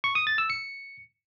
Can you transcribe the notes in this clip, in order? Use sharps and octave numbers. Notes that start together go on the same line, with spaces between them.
C#6
D#6
A6
E6
C#7